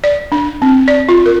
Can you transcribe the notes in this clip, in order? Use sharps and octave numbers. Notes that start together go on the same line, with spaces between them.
D5
D4
C4
D5
F4
A#4